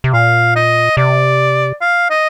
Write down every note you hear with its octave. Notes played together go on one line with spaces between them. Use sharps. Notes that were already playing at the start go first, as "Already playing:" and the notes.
C3
A#2 F5
D#5
C3 D5
F5
D#5